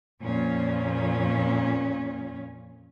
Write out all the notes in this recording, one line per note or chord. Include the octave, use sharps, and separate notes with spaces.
F2 A#2 C#4